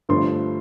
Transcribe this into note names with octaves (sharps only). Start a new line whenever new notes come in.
G1 G2 F3 A3 C6